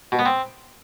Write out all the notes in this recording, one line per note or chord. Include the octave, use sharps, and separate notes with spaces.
B2
B3
C4